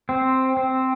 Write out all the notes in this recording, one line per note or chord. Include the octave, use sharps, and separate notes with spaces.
C4
C4